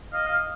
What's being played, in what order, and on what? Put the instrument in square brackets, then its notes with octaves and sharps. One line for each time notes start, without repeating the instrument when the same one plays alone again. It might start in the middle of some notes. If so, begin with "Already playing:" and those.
[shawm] D#5 [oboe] F5
[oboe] F5